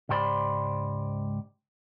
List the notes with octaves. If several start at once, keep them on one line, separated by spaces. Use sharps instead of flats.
C#2 G#2 G4 C5 D5 B5